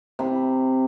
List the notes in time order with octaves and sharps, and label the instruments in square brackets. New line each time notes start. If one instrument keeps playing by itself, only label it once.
[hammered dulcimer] C3 B5